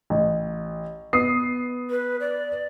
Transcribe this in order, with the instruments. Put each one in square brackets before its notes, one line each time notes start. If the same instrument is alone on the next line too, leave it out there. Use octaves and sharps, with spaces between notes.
[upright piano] A1
B3 D#6 C7
[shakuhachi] B4
D5